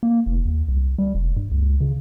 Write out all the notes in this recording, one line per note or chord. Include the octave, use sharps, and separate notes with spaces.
A#3
F1
D#2
C2
G3
F1
G2
C#2
C#3